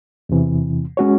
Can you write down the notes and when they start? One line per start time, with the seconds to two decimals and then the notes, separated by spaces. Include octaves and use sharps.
0.29 E2 C3 E3
0.97 G#3 C#4 F#4 C#5